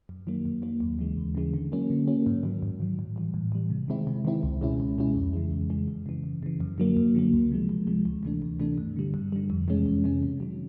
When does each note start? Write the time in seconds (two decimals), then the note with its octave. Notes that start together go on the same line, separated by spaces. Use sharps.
0.09 F#2
0.27 D#3 F#3 A#3
0.45 F#2
0.62 D#3 F#3 A#3
0.80 D#2
0.99 C#3 E3 G#3
1.17 D#2
1.35 C#3 E3 G#3
1.54 D3
1.72 F#3 A#3 C#4
1.90 D3
2.07 F#3 A#3 C#4
2.26 G#2
2.43 D#3 F#3
2.62 G#2
2.80 D#3 F#3
2.99 A2
3.16 E3 G3
3.34 A2
3.52 E3 G3
3.70 C3
3.88 D#3 G#3 C4 E4
4.07 C3
4.25 D#3 G#3 C4 E4
4.43 C#2
4.61 B2 G#3 C#4 E4
4.80 C#2
4.98 B2 G#3 C#4 E4
5.15 F2
5.33 C#3 E3 G#3
5.52 F2
5.70 C#3 E3 G#3
5.88 F#2
6.06 C#3 E3
6.24 F#2
6.43 C#3 E3
6.60 F#2
6.78 D3 F#3 A#3
6.97 F#2
7.15 D3 F#3 A#3
7.33 C#2
7.51 C3 F3 G#3
7.69 C#2
7.87 C3 F3 G#3
8.05 D2
8.23 C3 E3 A3 D4
8.42 D2
8.60 C3 E3 A3 D4
8.78 G2
8.96 D3 G3
9.14 G2
9.32 D3 G3
9.50 F2
9.68 C3 E3 G#3 C#4
9.86 F2
10.04 C3 E3 G#3 C#4
10.23 C3
10.40 D#3 F#3